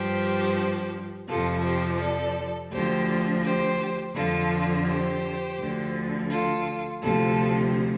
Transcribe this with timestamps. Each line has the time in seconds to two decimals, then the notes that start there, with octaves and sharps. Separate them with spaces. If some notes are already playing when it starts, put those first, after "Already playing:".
Already playing: G2 F3 G4 C5
1.28 F2 C3 F3 F4 A4
1.64 G4 C5
2.00 A4 D5
2.71 D2 D3 F3 G4 C5
3.44 G4 C5
4.15 F2 D3 F3 F4 A4
4.87 G4 C5
5.58 D2 D3 F3
6.30 F4 A4
7.01 D2 C3 F3 F4 A4